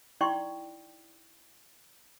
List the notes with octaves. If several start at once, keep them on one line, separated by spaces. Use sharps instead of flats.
D#4 E4 D5 G5 C6 C#6